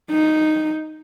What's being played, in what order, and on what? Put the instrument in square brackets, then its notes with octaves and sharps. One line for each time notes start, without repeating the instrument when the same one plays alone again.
[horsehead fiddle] D#4